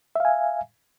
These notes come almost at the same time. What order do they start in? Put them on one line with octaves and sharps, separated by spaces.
E5 F5 G#5